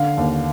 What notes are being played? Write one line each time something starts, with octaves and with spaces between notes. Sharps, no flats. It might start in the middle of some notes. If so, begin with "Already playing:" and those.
Already playing: D3 F5
D#2